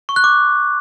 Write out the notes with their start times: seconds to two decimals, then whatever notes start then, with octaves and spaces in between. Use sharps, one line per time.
0.09 C#6
0.16 F#6
0.24 D6